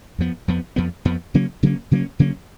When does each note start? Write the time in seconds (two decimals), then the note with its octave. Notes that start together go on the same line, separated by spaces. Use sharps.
0.19 F2 F3 B3
0.48 F2 F3 B3
0.76 F2 F3 B3
1.05 F2 F3 B3
1.34 C#3 F#3 A#3 C#4
1.63 C#3 F#3 A#3 C#4
1.91 C#3 F#3 A#3 C#4
2.19 C#3 F#3 A#3 C#4